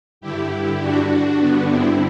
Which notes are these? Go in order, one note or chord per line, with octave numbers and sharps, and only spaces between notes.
G2 D3 E4 G4
D4 F#4
G2 D3 B3 D4
C4 E4